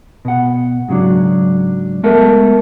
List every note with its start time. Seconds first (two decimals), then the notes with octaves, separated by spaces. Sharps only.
0.25 B2 F#5
0.89 G#2 C#3 F#3 D4
2.03 G#3 A3 B3 A4 A#4 E5